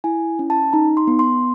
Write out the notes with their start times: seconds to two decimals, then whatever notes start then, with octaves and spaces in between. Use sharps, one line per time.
0.04 E4 G#5
0.39 C#4
0.50 A5
0.73 D#4 A#5
0.97 C6
1.07 B3
1.19 C6